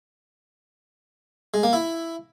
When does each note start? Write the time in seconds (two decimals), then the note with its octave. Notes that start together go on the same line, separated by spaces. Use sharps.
1.54 G#3
1.63 A#3
1.73 E4